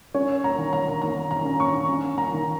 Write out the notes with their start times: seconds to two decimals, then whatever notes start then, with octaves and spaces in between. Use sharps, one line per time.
0.14 C#4 C#5
0.44 A#5
0.58 D#3
0.73 A#5
1.02 D#3 A#5
1.31 A#5
1.45 C#4
1.60 C#6
1.89 C#4
2.18 A#5
2.33 D#3